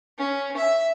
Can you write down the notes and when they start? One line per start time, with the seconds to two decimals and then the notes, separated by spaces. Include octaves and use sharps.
0.18 C#4
0.57 E5